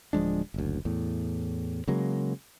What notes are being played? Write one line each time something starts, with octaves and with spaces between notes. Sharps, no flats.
D1 F3 G#3 D4
F#1 D2
E2 A2
C#3 F#3 G#3 A#3